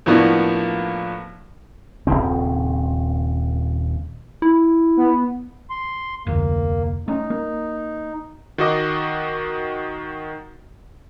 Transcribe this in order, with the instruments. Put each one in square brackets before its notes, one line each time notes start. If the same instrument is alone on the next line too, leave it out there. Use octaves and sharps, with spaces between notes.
[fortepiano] A2 F3 A#3 B3 D4 F#4
[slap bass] D#1 C2 C#3 C4
[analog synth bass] E4
[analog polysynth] B3
[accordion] C6
[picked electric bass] F1 D2 [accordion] A#3
[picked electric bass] A3 C#4 [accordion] D#4
[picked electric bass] A#3
[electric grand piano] D#3 F#4 D#5 D6